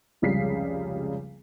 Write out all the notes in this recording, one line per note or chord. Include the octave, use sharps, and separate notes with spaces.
F1 C#2 C#3 G3 B6 C7